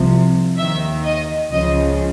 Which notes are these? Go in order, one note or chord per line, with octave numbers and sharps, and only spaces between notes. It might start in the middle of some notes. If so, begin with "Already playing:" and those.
Already playing: C2 C3 F3
D#2 D#3 E5
D#5
C#2 C#3 F3 D#5